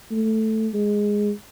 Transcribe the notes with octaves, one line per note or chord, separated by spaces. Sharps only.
A3
G#3